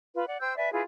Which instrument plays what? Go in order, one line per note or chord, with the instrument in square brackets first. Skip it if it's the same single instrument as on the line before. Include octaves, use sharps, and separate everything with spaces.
[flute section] F4 B4
D5 F#5
C5 G5 E6 G6
B4 D5 E5 G#5
E4 F4 G#4 B4